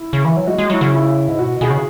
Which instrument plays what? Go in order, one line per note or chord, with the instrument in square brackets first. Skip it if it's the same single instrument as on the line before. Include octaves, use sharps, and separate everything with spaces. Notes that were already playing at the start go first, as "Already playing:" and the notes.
Already playing: [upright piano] E4
[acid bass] C#3
E3
F#3
[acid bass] G#3 [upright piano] F#4
[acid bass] G#3
[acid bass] F#3 [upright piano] E4
[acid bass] C#3
[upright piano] E4
[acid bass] G#2
[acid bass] B2 [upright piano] F#4
[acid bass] B2 [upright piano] G#4
[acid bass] C#3